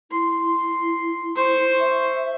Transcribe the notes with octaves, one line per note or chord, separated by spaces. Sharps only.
E4 C6
C5 C#6
E5